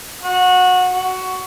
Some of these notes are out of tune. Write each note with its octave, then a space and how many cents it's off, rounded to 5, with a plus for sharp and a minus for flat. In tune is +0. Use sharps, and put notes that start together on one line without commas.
F#4 -20
F#4 +10